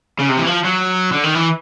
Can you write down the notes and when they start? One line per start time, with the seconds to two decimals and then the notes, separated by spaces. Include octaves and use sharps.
0.19 C#3
0.29 C3
0.37 E3
0.46 F3
0.64 F#3
1.12 D3
1.23 D#3
1.35 E3